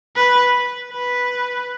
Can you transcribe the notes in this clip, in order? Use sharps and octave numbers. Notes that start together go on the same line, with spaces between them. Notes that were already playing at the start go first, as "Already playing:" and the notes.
B4
B4